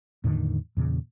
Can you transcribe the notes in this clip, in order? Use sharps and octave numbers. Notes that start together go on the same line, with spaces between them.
E2 A2 D3 D#3
E2 A#2 C#3